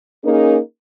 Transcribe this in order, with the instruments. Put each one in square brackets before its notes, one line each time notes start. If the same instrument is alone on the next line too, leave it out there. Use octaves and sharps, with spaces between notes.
[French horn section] A#3 C#4 D#4 G#4 A#4